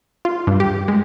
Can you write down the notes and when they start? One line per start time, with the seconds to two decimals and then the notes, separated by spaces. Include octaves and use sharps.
0.25 F4
0.47 G2
0.60 G4
0.88 G#3